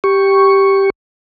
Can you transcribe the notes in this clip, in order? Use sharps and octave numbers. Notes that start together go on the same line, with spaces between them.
G4 C#6